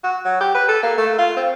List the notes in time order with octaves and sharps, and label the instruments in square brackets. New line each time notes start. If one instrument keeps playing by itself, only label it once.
[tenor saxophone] F#4
F#3
G4
B4
A4
A#3
A3
F4
C4